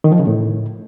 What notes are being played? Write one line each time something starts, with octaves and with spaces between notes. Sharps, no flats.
D#3
F3
C#3
A2